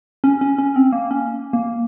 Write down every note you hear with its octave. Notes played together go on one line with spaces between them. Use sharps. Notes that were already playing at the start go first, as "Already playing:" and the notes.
C#4
C#4
C#4
C4
A#3
C#4
A#3